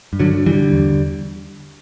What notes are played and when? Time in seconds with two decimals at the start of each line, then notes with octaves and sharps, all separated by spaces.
0.13 G2
0.20 D3 F#3
0.33 D3
0.46 E3 G3
0.53 D3
0.72 E2